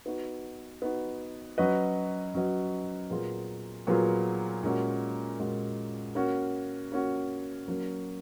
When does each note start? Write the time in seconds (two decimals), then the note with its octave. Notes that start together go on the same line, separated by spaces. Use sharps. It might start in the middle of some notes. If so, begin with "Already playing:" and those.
0.06 B3 D#4 F#4
0.82 B3 D#4 F#4
1.58 F#3 C#4 F#4 B4 D#5
2.35 F#3 C#4 F#4 B4 D#5
3.10 A#2 F#3 B3 F4 G#4
3.87 A#2 F#3 B3 F4 G#4
4.63 A#2 G#3 C#4 F#4
5.39 A#2 G#3 C#4 F#4
6.15 A#3 C#4 F#4
6.92 A#3 C#4 F#4
7.68 F#3 A#3 C#4